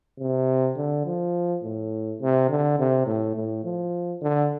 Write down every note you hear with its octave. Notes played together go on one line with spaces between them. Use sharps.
C3
D3
F3
A2
C3
D3
C3
A2
A2
F3
D3